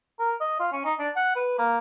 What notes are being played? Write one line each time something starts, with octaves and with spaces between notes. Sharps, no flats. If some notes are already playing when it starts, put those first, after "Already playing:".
A#4
D#5
F4
C#4
D#4
D4
F#5
B4
A#3